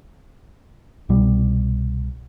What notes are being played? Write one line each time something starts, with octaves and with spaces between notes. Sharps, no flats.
C2 B2 G3